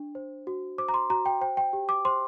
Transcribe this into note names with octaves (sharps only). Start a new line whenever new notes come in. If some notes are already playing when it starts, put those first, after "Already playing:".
Already playing: D4
C5
F#4
C5 D6
A#5
C6
F#4 A#5
G5
C5 G5
G5
G4
D6
C5 C6